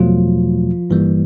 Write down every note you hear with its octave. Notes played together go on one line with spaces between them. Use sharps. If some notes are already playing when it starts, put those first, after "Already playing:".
Already playing: E2 B2 F3 F#3 A3 F4
G1 G2 E3 G3 A#3